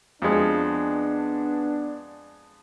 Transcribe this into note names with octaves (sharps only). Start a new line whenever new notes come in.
F2 G#3 B3 D4